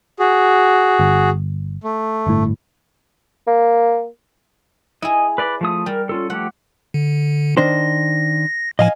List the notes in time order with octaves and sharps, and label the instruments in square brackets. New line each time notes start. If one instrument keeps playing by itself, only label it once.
[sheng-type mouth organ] F#4 G#4
[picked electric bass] G1
[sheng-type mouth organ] A3
[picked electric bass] G1 A2
[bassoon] A#3
[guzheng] E4 G#4 [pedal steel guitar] D#5
[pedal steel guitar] B4 D5 B5
F3 A3 D#6
[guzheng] G3 [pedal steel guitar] A#4
[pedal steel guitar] C#4 F4 A4
[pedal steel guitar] F3 A3 G4 [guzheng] F#5
[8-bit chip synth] D3
[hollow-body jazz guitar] D#3 D4 C5 [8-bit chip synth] A#6
[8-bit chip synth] A2 F3 [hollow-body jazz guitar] D#5 F5 G#5